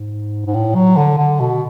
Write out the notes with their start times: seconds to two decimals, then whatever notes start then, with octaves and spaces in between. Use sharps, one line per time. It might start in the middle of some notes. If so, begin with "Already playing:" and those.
Already playing: G#2
0.46 G#2
0.54 A2
0.75 F#3
0.97 D3
1.18 D3
1.40 B2